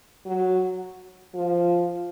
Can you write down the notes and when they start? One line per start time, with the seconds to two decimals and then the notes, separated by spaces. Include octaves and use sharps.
0.26 F#3
1.35 F3